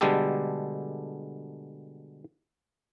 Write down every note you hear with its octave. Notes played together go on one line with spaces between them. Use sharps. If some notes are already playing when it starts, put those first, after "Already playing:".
B2 D3 G3 G#3 G4 A4